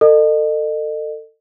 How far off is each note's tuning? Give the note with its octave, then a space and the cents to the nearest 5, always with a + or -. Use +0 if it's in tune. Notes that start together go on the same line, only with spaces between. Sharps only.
A4 +30 D#5 -35